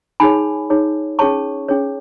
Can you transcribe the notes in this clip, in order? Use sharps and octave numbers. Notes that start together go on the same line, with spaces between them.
D#4 G#4 C#5 G#5 B5
D#4 G#4 C#5
C#4 G#4 C#5 A5 C#6
C#4 G#4 C#5